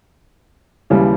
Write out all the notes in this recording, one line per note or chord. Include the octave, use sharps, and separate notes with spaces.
D#2 C#3 E3 G3